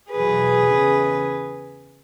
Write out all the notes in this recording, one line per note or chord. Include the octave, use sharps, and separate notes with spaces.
E2 B2 F#3 G#4 B4
E2 C#3 E3